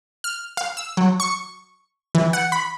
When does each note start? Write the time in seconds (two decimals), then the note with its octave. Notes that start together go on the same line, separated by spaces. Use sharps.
0.24 F6
0.57 F5
0.77 E6
0.97 F#3
1.20 C#6
2.15 E3
2.33 F#5
2.52 B5